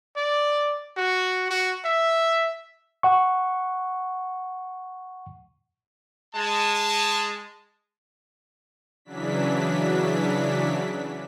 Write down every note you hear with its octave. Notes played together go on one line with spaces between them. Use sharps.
D5
F#4
F#4
E5
F#5 C#6
G#3 A5
C#3 E3 F#3 D4 B6